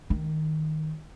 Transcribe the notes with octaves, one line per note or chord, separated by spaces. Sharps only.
D#3